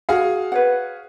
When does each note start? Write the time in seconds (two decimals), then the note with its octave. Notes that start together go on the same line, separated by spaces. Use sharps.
0.09 F#4 G#4 F5
0.52 B4 C#5 F#5